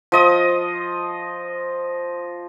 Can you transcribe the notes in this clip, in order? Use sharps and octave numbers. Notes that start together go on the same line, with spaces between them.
F3 D#5 D#6